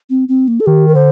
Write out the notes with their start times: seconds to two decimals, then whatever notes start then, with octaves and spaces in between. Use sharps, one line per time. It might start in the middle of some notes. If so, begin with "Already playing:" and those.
0.10 C4
0.29 C4
0.48 A#3
0.60 A4
0.66 D#3 G4
0.88 A#4
0.95 D3 C5